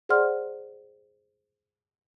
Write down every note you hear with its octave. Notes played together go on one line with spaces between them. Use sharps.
G#4 C5 D5 F#5 C6 F6